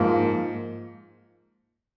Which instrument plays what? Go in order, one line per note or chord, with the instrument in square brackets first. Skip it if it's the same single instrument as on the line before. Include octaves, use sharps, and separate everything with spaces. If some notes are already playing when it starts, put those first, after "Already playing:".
Already playing: [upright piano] G#2 F3 A#3